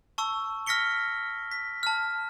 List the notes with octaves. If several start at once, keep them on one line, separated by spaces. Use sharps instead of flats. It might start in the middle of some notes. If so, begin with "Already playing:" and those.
A5 C#6 E6
F6 A#6 B6 C#7 G7
B6
A5 F6